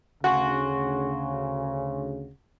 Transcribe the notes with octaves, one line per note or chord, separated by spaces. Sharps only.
D2 C#3 F#4 G#5 C6 C#6